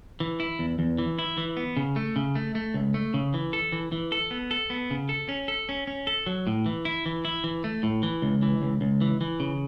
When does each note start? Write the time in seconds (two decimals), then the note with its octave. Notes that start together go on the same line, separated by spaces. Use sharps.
0.20 E3
0.40 E4
0.59 E2
0.79 E2
0.98 E3
1.19 E4
1.37 E3
1.57 B3
1.77 C#3
1.96 A3
2.16 C#3
2.35 A3
2.55 A3
2.74 C#2
2.94 A3
3.14 C#3
3.34 E3
3.53 A4
3.72 E3
3.92 E3
4.12 A4
4.31 B3
4.51 A4
4.70 B3
4.90 C#3
5.09 A4
5.29 C#4
5.48 A4
5.69 C#4
5.87 C#4
6.07 A4
6.26 F#3
6.47 A2
6.66 E3
6.85 E4
7.06 E3
7.25 E4
7.44 E3
7.64 A3
7.83 A2
8.03 E3
8.22 C#2
8.42 E3
8.62 C#2
8.81 C#2
9.01 E3
9.21 E3
9.40 C#3